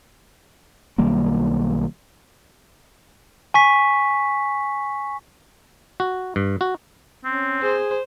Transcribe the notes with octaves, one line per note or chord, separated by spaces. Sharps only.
B1 D#3 G3 A#3
G#5 C#6 B6
F#4
G2
F#4
C4 C#4
G#4 C5